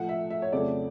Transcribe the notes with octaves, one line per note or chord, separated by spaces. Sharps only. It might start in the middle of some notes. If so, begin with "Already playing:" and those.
Already playing: A2 F3 A3 F#5
E5
E5
C#5
F2 C#3 F#3 A3 D5